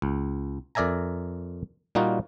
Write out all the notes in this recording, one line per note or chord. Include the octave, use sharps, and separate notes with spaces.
C#2
F2 A#4 D5 E5 G#5 A#5
A#2 G3 A#3 D#4 F4 F#4